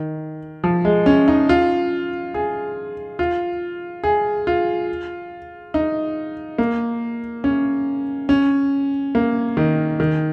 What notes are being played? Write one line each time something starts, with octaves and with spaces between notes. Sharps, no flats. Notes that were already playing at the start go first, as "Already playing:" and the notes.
Already playing: D#3
F3
G#3
C#4
D#4
F4
G#4
F4
G#4
F4
D#4
A#3
C#4
C#4
A#3
D#3
D#3